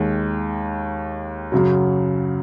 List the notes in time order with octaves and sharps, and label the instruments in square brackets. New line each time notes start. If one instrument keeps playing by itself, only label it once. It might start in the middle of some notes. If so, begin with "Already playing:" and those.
Already playing: [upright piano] D#2 D#3 G#3
F#2 C#3 F#3